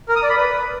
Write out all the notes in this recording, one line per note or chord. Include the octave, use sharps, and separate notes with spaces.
A#4
D#6
D5
B5
B4